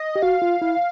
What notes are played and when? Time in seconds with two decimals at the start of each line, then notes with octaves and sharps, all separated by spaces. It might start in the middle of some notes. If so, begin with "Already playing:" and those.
Already playing: D#5
0.16 G4
0.22 F#4 F5
0.42 F4
0.62 E4